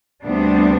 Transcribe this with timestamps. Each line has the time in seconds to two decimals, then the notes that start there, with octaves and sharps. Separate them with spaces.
0.24 D2 C3 G3 B3 D4